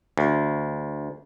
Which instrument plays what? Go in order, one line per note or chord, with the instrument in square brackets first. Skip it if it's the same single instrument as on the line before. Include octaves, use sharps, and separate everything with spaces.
[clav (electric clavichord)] D2